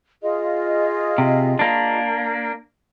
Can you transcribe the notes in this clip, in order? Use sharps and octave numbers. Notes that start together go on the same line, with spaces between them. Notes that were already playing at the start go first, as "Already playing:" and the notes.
F4 G#4 D#5
C3
A#3 D4